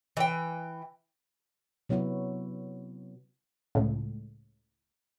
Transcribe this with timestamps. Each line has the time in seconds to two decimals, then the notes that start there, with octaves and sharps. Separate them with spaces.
0.17 E3 G5
1.89 C3 F#3 B3 E4 F#4
3.75 C#2 A2